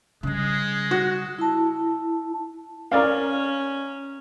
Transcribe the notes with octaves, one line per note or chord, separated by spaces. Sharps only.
C#3 G3 G#3
F#4
E4 A5
C#4 A#4 D5 F5